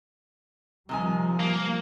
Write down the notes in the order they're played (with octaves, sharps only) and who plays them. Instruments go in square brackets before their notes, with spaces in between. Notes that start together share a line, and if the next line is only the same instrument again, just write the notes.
[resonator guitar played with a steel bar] C3 D#3 G#5 [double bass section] F3 G3
[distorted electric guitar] A#3